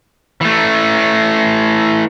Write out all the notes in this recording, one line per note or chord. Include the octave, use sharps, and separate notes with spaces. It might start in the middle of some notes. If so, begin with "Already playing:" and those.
E3 A3